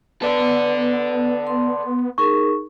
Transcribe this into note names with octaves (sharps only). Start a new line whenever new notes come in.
B3 A4 B4 D5
C6
D#4 G#4 A#4 C#6